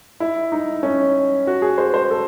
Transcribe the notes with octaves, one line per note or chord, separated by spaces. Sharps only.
E4
D#4
C#4
F#4
G#4
C5
C5
A4